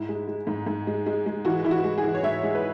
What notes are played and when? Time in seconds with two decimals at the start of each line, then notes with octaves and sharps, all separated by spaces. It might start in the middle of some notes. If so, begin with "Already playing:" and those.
Already playing: G#2 E4
0.09 G#3
0.28 G#3
0.47 G#2
0.66 G#2
0.87 G#3
1.06 G#3
1.26 G#3
1.45 E3 F#4
1.64 E3 E4
1.71 F#4
1.84 G#3
1.98 G#4
2.03 E3
2.15 C#5
2.23 G#2 E5
2.43 G#3
2.55 B4